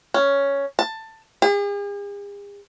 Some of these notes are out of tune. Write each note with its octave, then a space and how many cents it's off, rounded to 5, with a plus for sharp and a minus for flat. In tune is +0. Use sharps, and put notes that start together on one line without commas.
C#4 +5
A5 +15
G#4 -45